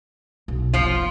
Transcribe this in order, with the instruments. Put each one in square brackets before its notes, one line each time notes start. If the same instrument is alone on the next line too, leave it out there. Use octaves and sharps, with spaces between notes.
[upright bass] B1
[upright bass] F#1 [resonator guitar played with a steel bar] F3 F4